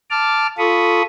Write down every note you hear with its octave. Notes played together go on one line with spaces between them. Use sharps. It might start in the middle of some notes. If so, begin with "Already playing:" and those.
A5 D6 F6
F4 A4 B5 C#6 D#6